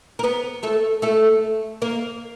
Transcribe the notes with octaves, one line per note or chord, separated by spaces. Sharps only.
A#4
B3 B4
A3 A4
A3 A4
A#3 A#4